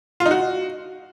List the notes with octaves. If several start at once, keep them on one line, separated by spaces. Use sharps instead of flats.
F4
D#4
F#4